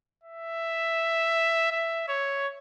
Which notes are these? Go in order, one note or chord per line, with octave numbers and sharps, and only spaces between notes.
E5
E5
C#5